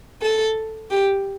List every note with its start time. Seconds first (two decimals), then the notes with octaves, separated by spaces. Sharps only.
0.21 A4
0.91 G4